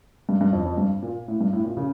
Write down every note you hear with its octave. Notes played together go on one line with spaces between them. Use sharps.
G2
G2
F2
F2
G2
A#2
A2
G2
A2
A#2
C#3